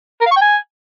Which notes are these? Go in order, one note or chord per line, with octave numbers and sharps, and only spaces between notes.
A#4
F5
C#6
G5
G#5